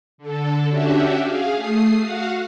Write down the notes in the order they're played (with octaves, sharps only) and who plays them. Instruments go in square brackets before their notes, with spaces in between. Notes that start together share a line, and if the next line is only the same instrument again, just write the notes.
[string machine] D3 A4
C#4 D4 F#4 G4 E5
G#4 F5
A3 D#6 C7
F#4 F5 F#5